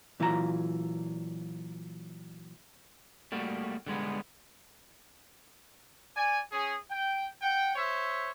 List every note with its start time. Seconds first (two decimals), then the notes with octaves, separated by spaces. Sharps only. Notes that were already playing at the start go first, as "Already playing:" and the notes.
0.20 A#2 E3 F#3 F4 G4 A#5
3.32 G3 A3 A#3 F#4
3.87 D3 G3 G#3 B3
6.17 D5 G#5
6.52 C#4 G#4
6.91 G5
7.42 F#5 G5
7.75 C5 C#5 E5